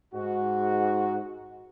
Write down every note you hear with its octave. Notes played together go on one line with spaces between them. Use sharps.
G#2 F#4